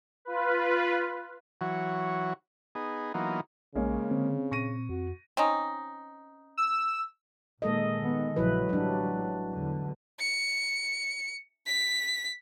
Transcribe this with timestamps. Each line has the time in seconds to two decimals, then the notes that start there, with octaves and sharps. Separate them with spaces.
0.25 F4 B4
1.61 E3 F#3 F#4 C#5
2.75 B3 D#4 G#4
3.14 E3 F#3 A#3 B3 D#4 F4
3.75 A#1 C#3 G#3 A#3 C#4
4.11 D3 C4
4.51 A#2 C#6 A#6 D#7
4.89 F2 F#4
5.37 C4 C#4 D#4
6.57 E6
7.62 A#2 D#3 G#3 A#3 A4 D#5
7.98 D#3 B3
8.36 A#1 C#3 F3 F#3 E4 B4
8.69 A1 D3 F#3 G3 D4
9.53 E2 D3
10.20 C#7
11.67 B6